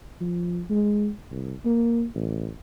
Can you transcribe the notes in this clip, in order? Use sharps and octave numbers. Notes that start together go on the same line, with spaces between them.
F3
G#3
C2
A#3
A1